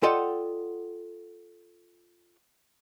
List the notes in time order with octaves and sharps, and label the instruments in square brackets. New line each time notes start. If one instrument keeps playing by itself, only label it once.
[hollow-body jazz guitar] F4 A4 D5 D#5 F#5 G5